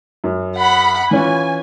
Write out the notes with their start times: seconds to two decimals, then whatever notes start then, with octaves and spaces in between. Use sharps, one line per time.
0.24 F#2
0.56 F#5 B5
1.11 E3 C#4 F4 G#5